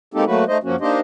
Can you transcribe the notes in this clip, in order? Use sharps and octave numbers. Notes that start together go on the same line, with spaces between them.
G#3 A#3 C4 D#4 G4 A4
F#3 A3 A#3 F#4 B4
A3 D#4 C5 D#5
F#2 F3 A#3 C#4 F#4
A#3 D4 D#4 G4 C5 D#5